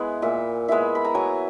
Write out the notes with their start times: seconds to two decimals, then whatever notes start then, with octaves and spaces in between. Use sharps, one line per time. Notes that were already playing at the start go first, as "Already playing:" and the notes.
Already playing: G#3 B3 E4 G#5
0.22 A#2 E5
0.68 G#3 B3 E4 E5
0.95 B5
1.05 A#5
1.15 F#3 G#5